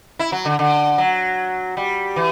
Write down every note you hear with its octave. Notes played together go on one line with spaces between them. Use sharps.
E4
F#3
D3
D3
F#3
G3
E3